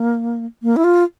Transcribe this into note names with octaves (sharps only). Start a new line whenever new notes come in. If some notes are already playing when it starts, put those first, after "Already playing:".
Already playing: A#3
A#3
E4
F4